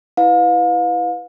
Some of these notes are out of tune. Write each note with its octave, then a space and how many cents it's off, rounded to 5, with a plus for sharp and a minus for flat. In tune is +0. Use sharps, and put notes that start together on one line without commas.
E4 -10 B4 +0 F5 +35